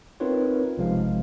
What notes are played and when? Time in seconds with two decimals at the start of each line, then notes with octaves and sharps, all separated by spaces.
0.20 C4 D#4 F4 A#4 B4 C#5
0.77 A1 C3 F3 G#3 F5